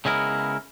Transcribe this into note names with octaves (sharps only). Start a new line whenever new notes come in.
C#3 G#3 B3 E4 A#4